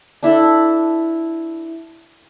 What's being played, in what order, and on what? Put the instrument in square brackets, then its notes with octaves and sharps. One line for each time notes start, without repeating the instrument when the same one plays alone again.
[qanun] D4 E4 A4